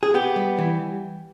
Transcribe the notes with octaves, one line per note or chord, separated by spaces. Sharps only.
G#4
B3 G4
G3
E3